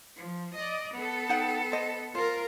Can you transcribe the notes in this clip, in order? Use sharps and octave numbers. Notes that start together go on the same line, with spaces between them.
F3
D5 D#5
B3 A4
D#4 F#5 G5
C5 D#5
F4 A#4 C5